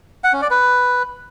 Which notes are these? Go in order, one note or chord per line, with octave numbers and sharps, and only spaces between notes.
F#5
C#4
D5
B4